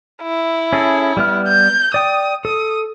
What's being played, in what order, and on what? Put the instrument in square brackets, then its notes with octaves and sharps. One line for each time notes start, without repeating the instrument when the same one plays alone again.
[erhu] E4
[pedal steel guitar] C#4 G#4 A4
G3 B3 F6
[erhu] G6
[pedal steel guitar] D5 G5 [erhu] D#6
[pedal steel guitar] A4 [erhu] D#6